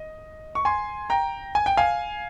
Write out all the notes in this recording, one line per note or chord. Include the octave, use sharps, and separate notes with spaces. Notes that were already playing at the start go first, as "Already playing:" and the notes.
Already playing: D#5
C#6
G#5 C6
G5 A#5
G#5
G5
F5 G#5